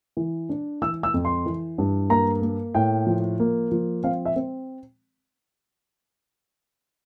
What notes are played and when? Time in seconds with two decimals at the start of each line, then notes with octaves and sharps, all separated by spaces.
0.17 E3
0.49 D4
0.82 E3 E6
1.03 E6
1.14 F2
1.25 C6
1.46 E3
1.78 G2
2.10 A#3 A#5
2.42 A#3
2.75 A2 G5
3.07 F3
3.40 A#3
3.72 F3
4.04 C4 F5
4.25 E5
4.36 C4